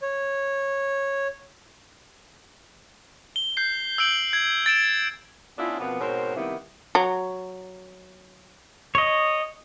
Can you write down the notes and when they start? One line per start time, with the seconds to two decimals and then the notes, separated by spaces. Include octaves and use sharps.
0.02 C#5
3.36 G7
3.57 G6 C7
3.98 E6 G6 D7 F#7
4.33 G#6
4.66 A6 D7 E7
5.58 B3 C#4 D4 E4 F4
5.79 F2 B2 F3 A#3 B3
5.99 G#2 B2 C4 A#4 C5 C#5
6.36 C3 D#3 G3 A#3 B3 E4
6.95 F#3
8.95 C#5 D#5